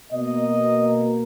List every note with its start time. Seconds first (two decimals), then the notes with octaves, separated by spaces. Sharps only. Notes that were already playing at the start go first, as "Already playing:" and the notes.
0.13 B2 A#3 D#5